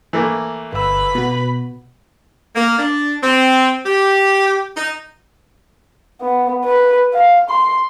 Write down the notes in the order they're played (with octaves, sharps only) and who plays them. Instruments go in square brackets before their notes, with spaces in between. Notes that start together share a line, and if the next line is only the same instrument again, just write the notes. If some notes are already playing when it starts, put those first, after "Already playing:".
[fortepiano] E3 A3 A#3
[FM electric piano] G1 E6 [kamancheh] B4 B5
[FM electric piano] B2 F#4
[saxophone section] A#3
D4
C4
G4
D#4
[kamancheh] B3
B4
F5
C6